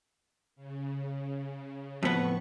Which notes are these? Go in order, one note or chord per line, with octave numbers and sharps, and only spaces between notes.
C#3
F2 A2 B3 C#6